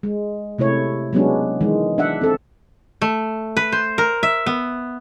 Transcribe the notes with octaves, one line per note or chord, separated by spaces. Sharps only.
G#3
C3 A3 E4 C#5
F#3 G#3 B3 C#4 D4
D#3 E3 G#3
D4 E5 F#5
C4 A4
A3
B4
C5
A#4
E5
B3